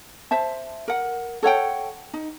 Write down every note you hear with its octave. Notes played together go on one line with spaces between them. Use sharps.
C5 E5 A5
A#4 F#5
A4 C#5 F#5 G5
D#4